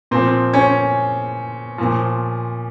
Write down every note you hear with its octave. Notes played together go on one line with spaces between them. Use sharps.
A#2 F3 C4
C#4
A#2 F3